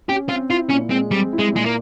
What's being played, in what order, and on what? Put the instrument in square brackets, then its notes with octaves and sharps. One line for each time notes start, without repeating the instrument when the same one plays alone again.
[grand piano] C#4 [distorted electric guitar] G4
[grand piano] C4 [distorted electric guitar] F4
[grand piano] E4 [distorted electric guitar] F4
[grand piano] A#2 [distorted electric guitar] C#4
[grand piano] G#3 [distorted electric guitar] C4
[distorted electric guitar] G3 [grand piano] C4
[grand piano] E4
[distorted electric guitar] G#3
[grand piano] A#2 [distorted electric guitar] G#3
[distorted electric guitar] A#3